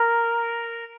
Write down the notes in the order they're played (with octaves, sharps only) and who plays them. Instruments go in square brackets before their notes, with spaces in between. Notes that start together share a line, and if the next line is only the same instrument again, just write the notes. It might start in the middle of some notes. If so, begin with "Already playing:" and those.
Already playing: [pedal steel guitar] A#4